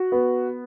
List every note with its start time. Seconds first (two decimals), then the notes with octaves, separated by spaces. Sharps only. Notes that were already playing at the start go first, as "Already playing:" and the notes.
Already playing: F#4
0.12 B3